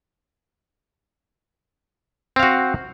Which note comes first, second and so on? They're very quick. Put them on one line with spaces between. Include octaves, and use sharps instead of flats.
C4 F5 F#4